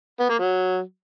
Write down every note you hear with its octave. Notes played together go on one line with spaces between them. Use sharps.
B3
A#3
F#3